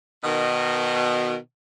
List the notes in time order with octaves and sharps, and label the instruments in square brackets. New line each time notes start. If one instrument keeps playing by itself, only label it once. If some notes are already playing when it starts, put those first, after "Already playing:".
[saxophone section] B2 D#3